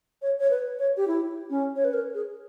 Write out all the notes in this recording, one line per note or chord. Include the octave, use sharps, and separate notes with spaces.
C#5
C#5
B4
C#5
G4
E4
C#4
C#5
B4
A#4
G#4